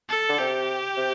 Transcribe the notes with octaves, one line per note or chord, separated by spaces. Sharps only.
A4
D3
C3 G4
C3